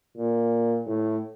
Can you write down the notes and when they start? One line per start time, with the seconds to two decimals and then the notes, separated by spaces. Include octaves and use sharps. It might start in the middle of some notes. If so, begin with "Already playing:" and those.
0.17 A#2
0.86 A2